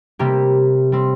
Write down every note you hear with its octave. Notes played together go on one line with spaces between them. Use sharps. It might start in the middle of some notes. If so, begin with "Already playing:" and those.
C3 G3 A#3 G4
G3 C4